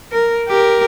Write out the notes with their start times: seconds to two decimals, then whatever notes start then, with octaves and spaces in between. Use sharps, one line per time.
0.12 A#4
0.48 G4 A#4